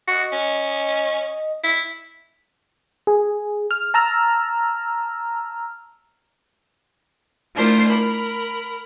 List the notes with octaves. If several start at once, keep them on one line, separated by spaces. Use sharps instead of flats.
F#4 D#5
C#4
E4
G#4
F6
A5 A#5 E6 F6
A3 D4 E4 F4 A#4 C5
A#4 B5